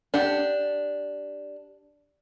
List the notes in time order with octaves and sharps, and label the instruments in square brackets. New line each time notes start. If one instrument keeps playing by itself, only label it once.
[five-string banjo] D4 G4 F#5